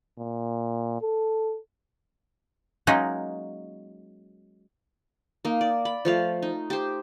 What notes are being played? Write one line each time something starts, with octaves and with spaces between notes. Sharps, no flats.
A#2
A4
F#3 G#3 A#3 C#4 D#4
A#3 D#4
D5
B5
F3 A3 F5
D#4
G4 C5